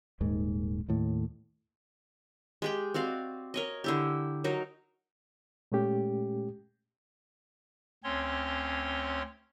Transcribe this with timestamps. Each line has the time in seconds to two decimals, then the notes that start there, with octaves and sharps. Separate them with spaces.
0.21 D#1 D#2 G#2 D#3
0.89 D#2 A2
2.62 G#3 G4 G5
2.94 C4 F#4 D5 F5
3.54 A#4 C#5 D#5
3.84 D3 E4 G4
4.44 F#3 D#4 A#4
5.72 A#2 G#3 A3 C#4 G4
8.04 D2 C4 C#4 C#5 C6